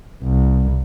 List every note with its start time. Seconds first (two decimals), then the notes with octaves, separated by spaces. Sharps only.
0.23 C2